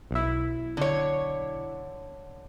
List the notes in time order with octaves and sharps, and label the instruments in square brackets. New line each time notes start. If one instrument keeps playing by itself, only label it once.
[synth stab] B1 E4
[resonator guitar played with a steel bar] D3 C#5